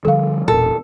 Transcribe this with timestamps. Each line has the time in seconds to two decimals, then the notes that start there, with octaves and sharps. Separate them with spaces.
0.05 D3 F3 G3 A4 F5
0.48 E1 A#2 A4 A#4